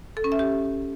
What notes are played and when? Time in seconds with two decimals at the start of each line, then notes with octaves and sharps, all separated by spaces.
0.17 A4
0.24 C#4
0.32 E5
0.39 G4